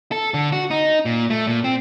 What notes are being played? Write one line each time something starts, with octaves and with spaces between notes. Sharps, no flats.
A4
D3
F#4
D#4
A#2
A3
A#2
C4